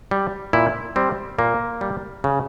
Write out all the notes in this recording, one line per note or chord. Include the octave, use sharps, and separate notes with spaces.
G3
A#2 E4
G3 C4
A#2 A#3
G3
C#3